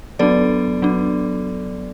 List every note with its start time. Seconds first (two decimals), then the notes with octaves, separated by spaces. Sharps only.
0.19 F#3 B3 D4 A4 D5
0.82 F#3 B3 D4